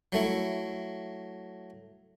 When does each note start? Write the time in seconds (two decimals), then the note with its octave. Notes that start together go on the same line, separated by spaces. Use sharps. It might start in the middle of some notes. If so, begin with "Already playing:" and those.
0.12 F#3 A3 E4